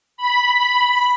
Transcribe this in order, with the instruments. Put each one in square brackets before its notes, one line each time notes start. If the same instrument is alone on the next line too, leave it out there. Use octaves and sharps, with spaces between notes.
[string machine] B5